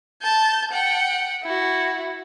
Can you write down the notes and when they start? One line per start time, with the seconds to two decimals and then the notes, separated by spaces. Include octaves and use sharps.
0.22 A5 G6
0.71 F#5 G5
1.43 E4 F#4